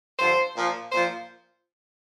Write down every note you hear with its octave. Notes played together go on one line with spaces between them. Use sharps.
G2 D3 F3 C5
A#2 F3
A#2 F3 C5